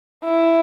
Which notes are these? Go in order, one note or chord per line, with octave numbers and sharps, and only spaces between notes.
E4